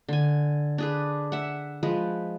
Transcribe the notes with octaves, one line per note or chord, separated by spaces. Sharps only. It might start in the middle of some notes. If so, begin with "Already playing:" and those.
D3 G#5
D4 G#4 B4
E5 F#5
F3 G#3 B4